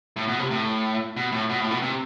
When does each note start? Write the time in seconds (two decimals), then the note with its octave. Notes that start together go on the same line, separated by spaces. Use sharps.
0.16 A2
0.28 B2
0.39 C3
0.51 A2
1.17 B2
1.32 A2
1.50 B2
1.61 A2
1.71 B2
1.82 C3